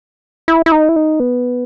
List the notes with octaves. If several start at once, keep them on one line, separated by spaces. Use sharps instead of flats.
E4
E4
D#4
E4
D#4
B3